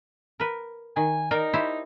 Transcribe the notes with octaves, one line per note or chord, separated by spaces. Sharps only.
A#4 B4
D#3 G#5
D#4 A#4 D5 G5
E4 G4 C5